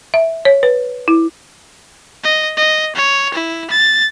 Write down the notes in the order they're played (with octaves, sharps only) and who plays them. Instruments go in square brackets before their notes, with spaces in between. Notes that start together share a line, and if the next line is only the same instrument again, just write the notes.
[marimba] E5
C#5
B4
E4
[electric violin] D#5
D#5
C#5
E4
A6